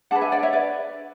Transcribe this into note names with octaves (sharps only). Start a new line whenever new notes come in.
D4 G#4 B4 F#5 A5
E5 G#5
D5 F#5
C#5 E5
B4 D5